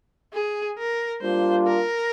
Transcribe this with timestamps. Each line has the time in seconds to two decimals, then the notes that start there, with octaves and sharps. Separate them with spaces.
0.33 G#4
0.78 A#4
1.22 G3 A#3 D4 F4 C5
1.66 A#4